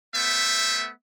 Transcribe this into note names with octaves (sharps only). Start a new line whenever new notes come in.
A3 B3 C5 E5